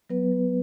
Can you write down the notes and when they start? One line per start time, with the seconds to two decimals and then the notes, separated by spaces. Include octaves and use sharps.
0.10 F#3 B3 B4
0.32 F#3